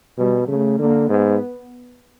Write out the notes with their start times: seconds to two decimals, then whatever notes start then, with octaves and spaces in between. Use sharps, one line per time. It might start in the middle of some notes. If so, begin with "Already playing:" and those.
0.18 B2 G3
0.48 C#3 A3
0.79 D3 A#3
1.09 G#2 B3